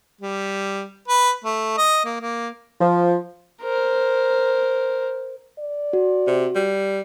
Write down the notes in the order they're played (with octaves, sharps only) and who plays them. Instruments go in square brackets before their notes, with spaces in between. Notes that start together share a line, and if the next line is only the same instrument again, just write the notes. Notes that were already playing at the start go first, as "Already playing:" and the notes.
[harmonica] G3
B4
A3
D#5
A#3
A#3
[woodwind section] F3
[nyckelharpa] A#4 C5
[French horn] D5
[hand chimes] F#4
[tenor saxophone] C3
G3